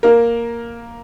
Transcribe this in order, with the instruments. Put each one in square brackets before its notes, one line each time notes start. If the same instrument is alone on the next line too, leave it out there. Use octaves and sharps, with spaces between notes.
[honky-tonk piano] A#3 A#4